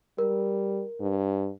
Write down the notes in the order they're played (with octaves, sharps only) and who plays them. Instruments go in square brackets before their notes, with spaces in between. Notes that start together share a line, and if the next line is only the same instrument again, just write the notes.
[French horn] G3 [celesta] A#4
[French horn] G2